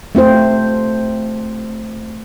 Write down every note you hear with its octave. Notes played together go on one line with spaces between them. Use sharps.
A3 C4 F4 C5